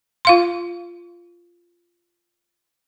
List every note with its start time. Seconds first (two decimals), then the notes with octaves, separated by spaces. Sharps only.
0.25 F4 F5 C6